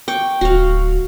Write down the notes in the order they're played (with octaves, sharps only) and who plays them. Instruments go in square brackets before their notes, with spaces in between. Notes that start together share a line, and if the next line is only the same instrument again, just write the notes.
[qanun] G5 C#6 D6
[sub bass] D1 [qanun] F#4 F5